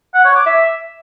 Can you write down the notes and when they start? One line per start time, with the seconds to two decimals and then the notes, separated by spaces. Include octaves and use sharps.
0.14 F#5
0.25 C#5
0.36 D6
0.46 E5